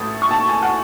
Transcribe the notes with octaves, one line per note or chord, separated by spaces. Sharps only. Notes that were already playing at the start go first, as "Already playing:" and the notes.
Already playing: A1 A2 A3 E4 D#6
C#6
A5
G#5
F#5